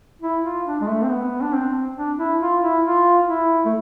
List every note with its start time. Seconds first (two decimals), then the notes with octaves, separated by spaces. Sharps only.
0.22 E4
0.44 F4
0.66 D4
0.81 G#3
0.88 A3
1.02 C4
1.09 B3
1.42 D4
1.53 C4
1.97 D4
2.19 E4
2.41 F4
2.62 E4
2.85 F4
3.28 E4
3.66 A3